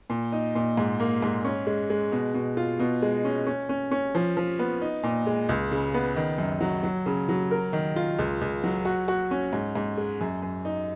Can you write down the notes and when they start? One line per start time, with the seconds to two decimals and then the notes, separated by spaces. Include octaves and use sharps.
0.10 A#2
0.32 D#4
0.55 A#2
0.77 G#2
1.00 A#3
1.22 G#2
1.44 C#4
1.67 G#3
1.90 G#3
2.12 B2
2.34 B2
2.57 F4
2.79 B2
3.02 G#3
3.25 C#4
3.47 C#4
3.69 C#4
3.91 C#4
4.15 F3
4.37 F3
4.59 B3
4.81 D#4
5.03 A#2
5.26 G#3
5.49 C#2
5.71 C#3
5.94 B3
6.16 D#3
6.38 F#2
6.61 F#3
6.83 F#3
7.06 C#3
7.29 F#3
7.51 A#4
7.73 D#3
7.96 F4
8.19 C#2
8.41 C#2
8.64 F#3
8.85 F#4
9.08 F#4
9.31 C#4
9.53 G#2
9.75 G#2
9.98 G#3
10.21 F#2
10.42 F#2
10.65 D#4